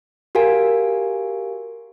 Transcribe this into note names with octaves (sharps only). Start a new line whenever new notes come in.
F#4 G4 A#4 F5 G#5